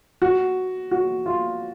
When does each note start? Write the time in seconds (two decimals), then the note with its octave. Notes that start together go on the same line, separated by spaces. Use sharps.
0.22 F#4
0.91 F#4
1.26 F4